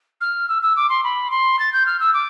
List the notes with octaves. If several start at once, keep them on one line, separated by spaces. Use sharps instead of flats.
F6
E6
E6
D6
C6
B5
C6
A6
G6
F6
E6
D6